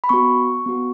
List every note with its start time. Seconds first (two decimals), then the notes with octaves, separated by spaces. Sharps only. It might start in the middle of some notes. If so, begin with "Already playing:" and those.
0.04 B5
0.09 B3 F#4 C#6
0.66 B3 F#4